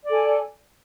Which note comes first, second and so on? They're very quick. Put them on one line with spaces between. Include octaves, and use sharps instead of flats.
D5 A4 G#5